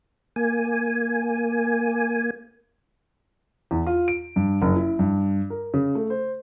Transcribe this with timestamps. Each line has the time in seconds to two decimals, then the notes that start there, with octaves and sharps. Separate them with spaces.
0.36 A#3 G#5
3.71 E2
3.87 F4
4.08 D7
4.36 G2
4.62 F#1
4.76 E4
4.99 G2
5.50 A#4
5.74 C#3
5.95 A3
6.10 C5